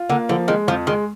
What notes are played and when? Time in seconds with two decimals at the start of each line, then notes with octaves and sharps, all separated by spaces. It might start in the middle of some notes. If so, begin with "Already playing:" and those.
Already playing: F4
0.10 D3 A#3
0.29 D3 F3
0.48 D#3 G#3
0.68 F2 F3
0.87 D#3 G#3